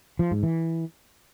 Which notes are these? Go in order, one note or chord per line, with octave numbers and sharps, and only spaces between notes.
F3
G#2
E3